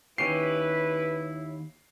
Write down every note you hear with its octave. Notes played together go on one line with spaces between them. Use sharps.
D#2 C#4 E4 G4 B4 C7